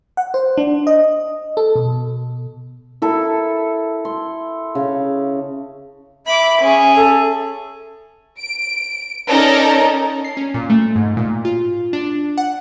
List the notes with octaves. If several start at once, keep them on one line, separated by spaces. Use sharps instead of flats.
F#5
C5
D4
D#5
A4
B2
E4 A4 A#4 E5
C6
C#3
E5 B5 D6
C#4 G#4
A4
D7
C#4 D#4 A4 A#4 D5
C7
C#4
A#2
A3
G#2
A#2
F4
D4
F#5